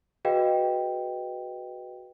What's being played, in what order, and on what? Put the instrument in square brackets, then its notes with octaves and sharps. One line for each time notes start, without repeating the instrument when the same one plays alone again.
[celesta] F#4 G#4 B4 D#5 F5 G5